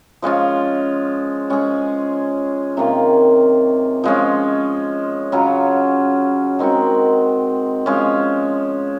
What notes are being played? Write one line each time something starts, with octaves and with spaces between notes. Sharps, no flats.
F3 G#3 C#4 F4
G#3 C#4 G#4
C3 D#3 A#3 F4
F3 G#3 C#4
C#3 F#3 C#4 F4
D#3 G#3 C4 F#4
F3 G#3 C#4